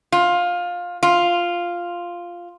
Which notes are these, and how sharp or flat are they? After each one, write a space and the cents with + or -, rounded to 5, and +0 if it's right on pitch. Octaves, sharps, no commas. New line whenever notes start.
F4 +15
F4 +0